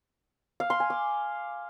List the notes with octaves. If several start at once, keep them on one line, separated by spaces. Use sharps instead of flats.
F5
C6
G#5
D6